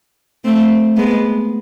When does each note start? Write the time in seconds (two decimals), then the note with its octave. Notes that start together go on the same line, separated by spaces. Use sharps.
0.45 A3 C4
0.96 G#3 B3